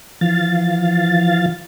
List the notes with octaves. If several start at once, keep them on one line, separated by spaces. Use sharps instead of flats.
E3 F3 F5 A6